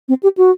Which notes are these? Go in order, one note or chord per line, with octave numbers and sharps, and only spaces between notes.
C4
G4
F#4